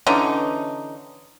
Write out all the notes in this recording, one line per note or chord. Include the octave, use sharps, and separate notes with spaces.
D3 E3 C#4 D#4